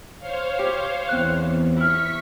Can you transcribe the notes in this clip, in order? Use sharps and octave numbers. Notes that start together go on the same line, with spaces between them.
C5 C#5 F5
G4
E2 C4 F#6
E4 C#6 F6 B6